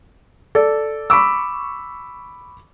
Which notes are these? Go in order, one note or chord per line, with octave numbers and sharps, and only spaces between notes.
A4 D5
B5 C#6 D6 E6